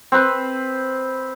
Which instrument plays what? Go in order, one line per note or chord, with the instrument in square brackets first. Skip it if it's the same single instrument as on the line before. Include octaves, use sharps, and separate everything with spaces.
[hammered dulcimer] C4 B4